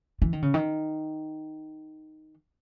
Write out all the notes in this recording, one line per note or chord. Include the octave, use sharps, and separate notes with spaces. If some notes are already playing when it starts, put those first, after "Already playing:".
E3
D#3
C#3
D#3